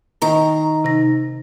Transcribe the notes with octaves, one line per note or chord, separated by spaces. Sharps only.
D#3 A#5
C3 D#4 A#6